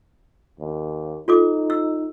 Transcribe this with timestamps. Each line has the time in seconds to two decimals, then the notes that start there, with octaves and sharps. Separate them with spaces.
0.60 D#2
1.28 D#4 F4 A4 D6
1.70 E6